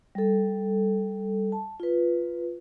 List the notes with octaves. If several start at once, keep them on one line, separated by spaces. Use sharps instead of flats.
G3 A4
A5
F4 B4